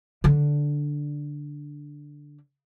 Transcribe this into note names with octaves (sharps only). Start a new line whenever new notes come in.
D3 D4